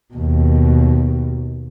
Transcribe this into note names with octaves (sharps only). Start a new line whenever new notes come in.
D#2 B2